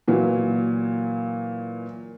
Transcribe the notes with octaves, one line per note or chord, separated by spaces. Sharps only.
A#2 E3 F#3